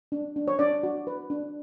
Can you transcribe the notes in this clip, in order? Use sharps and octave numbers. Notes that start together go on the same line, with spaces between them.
D4
D4
C#5
D4 D5
F#4
B4
D4